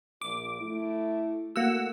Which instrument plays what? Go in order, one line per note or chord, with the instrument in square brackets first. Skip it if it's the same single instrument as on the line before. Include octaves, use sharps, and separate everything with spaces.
[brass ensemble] A#1 [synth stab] D6
[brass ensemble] A3 E4
[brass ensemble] A3 F#4 [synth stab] A#3 F#5 E6